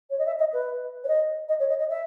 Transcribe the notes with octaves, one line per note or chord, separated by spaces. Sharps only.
C#5
D#5
E5
D#5
B4
C#5
D#5
D#5
C#5
D#5
D#5
E5